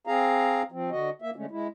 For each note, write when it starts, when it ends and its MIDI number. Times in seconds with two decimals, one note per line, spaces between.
0.07 0.62 60
0.07 0.62 68
0.07 0.62 77
0.07 0.62 82
0.72 0.90 53
0.72 0.90 60
0.91 1.10 50
0.91 1.10 66
0.91 1.10 75
1.22 1.31 58
1.22 1.31 76
1.36 1.46 50
1.36 1.46 56
1.36 1.46 57
1.36 1.46 61
1.51 1.67 56
1.51 1.67 64